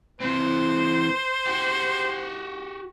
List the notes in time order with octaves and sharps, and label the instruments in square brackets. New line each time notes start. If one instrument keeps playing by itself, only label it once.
[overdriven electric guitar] E3 C4 [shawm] C5
[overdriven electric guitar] F#4 G4